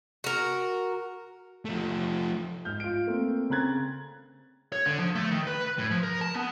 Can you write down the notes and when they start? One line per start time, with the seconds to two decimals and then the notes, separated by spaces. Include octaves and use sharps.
0.24 F#4 A#4
1.65 F3 A3
2.65 G#2 F6 G6
2.80 F4 D7
3.07 A3 A#3 C4
3.50 C#3 C4 A#5 F#6 G#6 A6
4.72 C#5
4.86 D3
4.99 F3
5.15 A3
5.31 D#3
5.47 B4
5.78 A2
5.91 F3
6.03 A#4
6.21 A5
6.35 B3